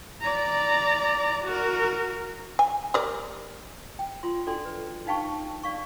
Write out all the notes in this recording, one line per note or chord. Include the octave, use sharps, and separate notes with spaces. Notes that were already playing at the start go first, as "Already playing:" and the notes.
D5 A#5
F#4 A#4
G#5
G4 A#4 D5
G5
F4 C6
D4 F#4 A4 D5 G5 C6
B4
D4 D#4 F5 G5 A5 C#6
D5 F5 C#6